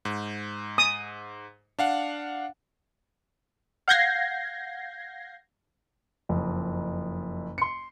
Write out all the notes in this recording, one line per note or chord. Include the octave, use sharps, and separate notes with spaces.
G#2
D#6
D4 F5 F#5
F5 F#5 G6 G#6 A#6 C7
F#1 F2
C6 C#7